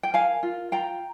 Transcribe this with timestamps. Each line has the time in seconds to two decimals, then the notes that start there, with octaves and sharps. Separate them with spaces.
0.03 G5
0.14 A#4 F5 G#5
0.43 F4
0.72 F4 G5 A#5